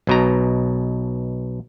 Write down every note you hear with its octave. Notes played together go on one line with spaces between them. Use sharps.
B1 B2 A#5